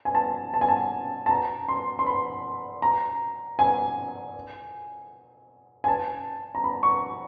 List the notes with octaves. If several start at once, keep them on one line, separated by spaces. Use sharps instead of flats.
G#5
A5
A5
G#5
A5
A5
A#5
C6
C6
B5
A#5
G#5
G#5
A5
A#5
B5
C#6